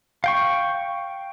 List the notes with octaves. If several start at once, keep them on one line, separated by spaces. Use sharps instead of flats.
F5 G5 C#6